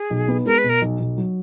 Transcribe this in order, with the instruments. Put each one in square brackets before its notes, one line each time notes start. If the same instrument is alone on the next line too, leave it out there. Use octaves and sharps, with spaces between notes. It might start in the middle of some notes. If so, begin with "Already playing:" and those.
Already playing: [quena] G#4
[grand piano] B1
B3
[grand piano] G#3 [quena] A#4
[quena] B4
[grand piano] B2
[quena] A#4
[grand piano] B1
B1
F#3